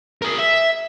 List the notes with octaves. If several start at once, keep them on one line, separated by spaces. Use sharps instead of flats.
G#4 A#4
E5